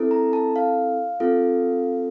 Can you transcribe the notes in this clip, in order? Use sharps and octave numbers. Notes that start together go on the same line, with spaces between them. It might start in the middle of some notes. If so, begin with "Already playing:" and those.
Already playing: C4 E4 A4
A#5
A5
F5
C4 F4 A4